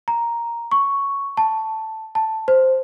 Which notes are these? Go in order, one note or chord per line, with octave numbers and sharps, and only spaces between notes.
A#5
C#6
A5
A5
C5